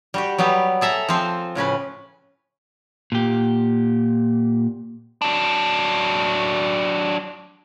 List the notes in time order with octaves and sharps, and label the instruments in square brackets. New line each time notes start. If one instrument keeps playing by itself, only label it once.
[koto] G3 F#4 G4
F#3 G3 B3 G4
G#4 A4 E5 A5 A#5
F3 C4 C5
A2 C#3 C#4 B4
[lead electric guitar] A#2 G4
F#3 D4